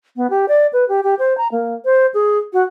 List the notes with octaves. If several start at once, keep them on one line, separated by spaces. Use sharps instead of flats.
B3
G4
D5
B4
G4
G4
C5
A#5
A#3
C5
G#4
F#4